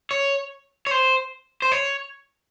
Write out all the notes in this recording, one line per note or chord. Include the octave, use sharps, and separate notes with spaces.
C#5
C#5
C5
C5
C#5